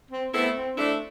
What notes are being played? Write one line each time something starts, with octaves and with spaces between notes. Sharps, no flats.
C4
A3 B3 C4 E4 A4 E5
C4
A3 C4 D4 E4 A4 E5